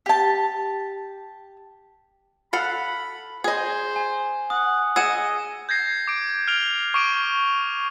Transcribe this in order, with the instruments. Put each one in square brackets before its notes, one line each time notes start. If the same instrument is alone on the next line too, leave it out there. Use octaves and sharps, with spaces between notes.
[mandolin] G4 A5
[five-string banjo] A4 F5 F#5 [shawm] B5
[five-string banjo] G#4 D#5 [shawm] C5
[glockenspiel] G#5
[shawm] F#5 [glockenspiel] D#6
[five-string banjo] G#4 F#5 [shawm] D#5 [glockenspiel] E6 D#7 E7
[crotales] G6 G#6 A#6 C7
D6 D7
F6 D7 F7 G7
C#6 D6 D7 D#7